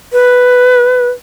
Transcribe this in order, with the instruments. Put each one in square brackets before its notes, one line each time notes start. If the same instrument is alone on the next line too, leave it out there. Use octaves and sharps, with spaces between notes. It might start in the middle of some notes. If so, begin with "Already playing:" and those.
[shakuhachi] B4